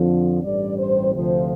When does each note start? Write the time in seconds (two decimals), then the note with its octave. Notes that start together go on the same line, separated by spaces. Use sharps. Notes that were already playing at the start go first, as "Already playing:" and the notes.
Already playing: F2 D3 F3
0.42 A1 G2 G3 D5
0.78 C5
1.13 D2 C3 F3 C5